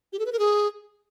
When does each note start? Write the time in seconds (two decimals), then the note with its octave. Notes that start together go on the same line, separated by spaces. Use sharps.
0.13 G4
0.19 A4
0.26 B4
0.32 A#4
0.39 G#4